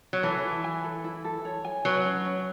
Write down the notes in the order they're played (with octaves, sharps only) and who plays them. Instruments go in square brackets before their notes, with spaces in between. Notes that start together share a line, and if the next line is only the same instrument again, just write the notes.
[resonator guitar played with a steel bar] F#3
[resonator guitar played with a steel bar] E3 [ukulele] A4
[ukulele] E4
G#5
A4
E4
A4
C#5
G#5
[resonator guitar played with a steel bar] F#3 [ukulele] B4
[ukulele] C#4
C#4